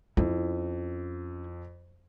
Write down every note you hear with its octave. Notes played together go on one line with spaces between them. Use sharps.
F2 C#4 E4